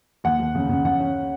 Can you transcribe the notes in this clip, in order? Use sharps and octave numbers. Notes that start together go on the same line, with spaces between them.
D#2 F#5
D#2
C#3
C#3
C#3 F#5
C#4